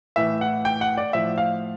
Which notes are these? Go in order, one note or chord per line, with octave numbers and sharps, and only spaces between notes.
A2 E3 E5
F#5
G5
F#5
D5
A2 F3 E5
F5